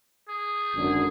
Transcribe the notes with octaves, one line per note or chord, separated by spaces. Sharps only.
G#4
G#1 F#2 D3